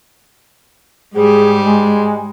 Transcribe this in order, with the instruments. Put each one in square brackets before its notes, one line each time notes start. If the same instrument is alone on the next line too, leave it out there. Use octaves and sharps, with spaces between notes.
[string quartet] G#2 G3 [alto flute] G#4
[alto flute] G#3